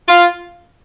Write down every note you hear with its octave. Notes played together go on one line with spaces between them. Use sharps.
F4